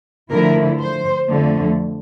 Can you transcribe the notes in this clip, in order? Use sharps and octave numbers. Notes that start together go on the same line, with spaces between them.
D3 F3 A3 E4 A#4
C5
F2 D3 F3 A3